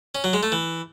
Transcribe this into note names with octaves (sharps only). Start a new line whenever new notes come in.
C#4
F#3
G#3
A3
E3